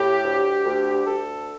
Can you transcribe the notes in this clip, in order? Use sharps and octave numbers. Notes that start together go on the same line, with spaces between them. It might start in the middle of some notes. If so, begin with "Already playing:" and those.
Already playing: A2 G4
D2
D2
D2 A4